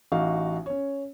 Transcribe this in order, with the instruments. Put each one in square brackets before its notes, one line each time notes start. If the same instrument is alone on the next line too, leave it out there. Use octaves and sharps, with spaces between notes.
[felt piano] A1 D#4 F#4 F5
C#4 C#5